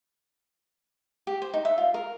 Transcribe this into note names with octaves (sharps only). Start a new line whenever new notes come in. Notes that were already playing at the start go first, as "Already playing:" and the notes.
G4
C5
D#4
E5
F4
A#4